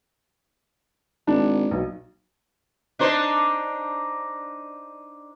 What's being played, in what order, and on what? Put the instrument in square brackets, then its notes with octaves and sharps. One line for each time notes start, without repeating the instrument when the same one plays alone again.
[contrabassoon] G#1 [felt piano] D4
[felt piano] B1
[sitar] D4 D#4 C5